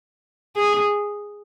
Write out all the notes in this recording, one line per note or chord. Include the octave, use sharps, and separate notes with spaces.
G#4